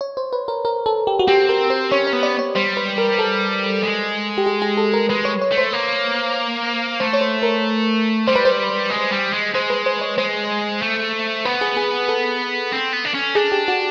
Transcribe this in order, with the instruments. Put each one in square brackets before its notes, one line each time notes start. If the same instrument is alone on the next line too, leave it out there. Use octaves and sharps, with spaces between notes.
[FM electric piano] C#5
C5
B4
A#4
A#4
A4
G4
F#4
[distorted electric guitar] C4 [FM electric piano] G4
[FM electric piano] A#4
C5
[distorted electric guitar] C#4 [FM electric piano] C#5
[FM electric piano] C#5
[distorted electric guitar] B3
[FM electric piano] D5
C#5
[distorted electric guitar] G3 [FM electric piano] C5
[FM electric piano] B4
A#4
A4
[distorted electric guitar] G#3
[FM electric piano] G4
G#4
G#4
A4
A#4
[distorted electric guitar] G#3 [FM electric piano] B4
[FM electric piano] C#5
C#5
[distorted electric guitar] A3
[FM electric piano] C5
[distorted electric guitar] A#3
[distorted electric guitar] A3 [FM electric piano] C5
[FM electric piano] C#5
C5
A#4
[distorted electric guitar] G3 [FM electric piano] C5
[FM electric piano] B4
C5
[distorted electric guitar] G#3
G3
G#3
[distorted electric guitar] G#3 [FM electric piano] C5
[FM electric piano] B4
C5
C#5
[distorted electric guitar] G#3 [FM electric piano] C5
[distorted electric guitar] A3
[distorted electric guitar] B3 [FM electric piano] B4
[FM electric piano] G#4
G#4
A4
[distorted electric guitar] C4
B3
D4
C#4
[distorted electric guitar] D4 [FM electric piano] G#4
[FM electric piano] G4
F#4